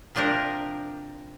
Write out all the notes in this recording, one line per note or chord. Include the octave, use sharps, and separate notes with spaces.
C3 F3 D4 G4 A#4